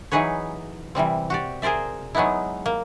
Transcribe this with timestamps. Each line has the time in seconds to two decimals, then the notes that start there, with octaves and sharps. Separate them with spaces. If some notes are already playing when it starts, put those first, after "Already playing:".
0.12 E3 F#3 D#4 G#4 B4 C#5
0.95 C3 E3 G3 C4
1.30 F#4 G4 D5
1.62 G#4 A#4 C5 D5 E5
2.15 F#3 G#3 B3 D#4 E4
2.66 A#3